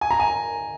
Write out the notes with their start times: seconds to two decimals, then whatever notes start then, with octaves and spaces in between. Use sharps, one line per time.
0.01 G#5
0.11 A#5
0.20 G#5